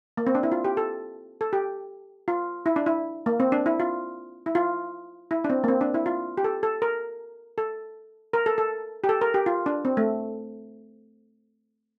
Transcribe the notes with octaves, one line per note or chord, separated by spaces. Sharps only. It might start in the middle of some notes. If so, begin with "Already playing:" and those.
A#3
C4
D4
E4
F4
G4
A4
A4
G4
F4
E4
D4
E4
A#3
C4
D4
E4
F4
E4
F4
E4
D4
C4
A#3
C4
D4
E4
F4
G4
A4
A4
A#4
A4
A#4
A4
A4
G4
A4
A#4
G4
F4
D4
C4
A3